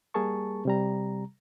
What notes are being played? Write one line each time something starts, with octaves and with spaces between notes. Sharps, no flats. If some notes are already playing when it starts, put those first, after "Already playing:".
G3 A#3 G#4 A#4 A5 C#6
C3 G3 A#5